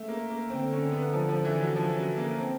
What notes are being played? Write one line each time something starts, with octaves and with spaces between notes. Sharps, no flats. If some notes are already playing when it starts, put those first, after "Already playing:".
Already playing: A3
A#3
A#3
D3 C4
C#4
B3
F3
F3
E3
F#3
F3
F#3
A#3
C4